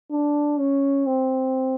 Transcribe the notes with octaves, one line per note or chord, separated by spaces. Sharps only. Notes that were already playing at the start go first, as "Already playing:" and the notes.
D4
C#4
C4